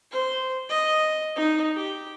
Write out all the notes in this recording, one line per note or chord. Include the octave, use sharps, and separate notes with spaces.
C5
D#5
D#4
G4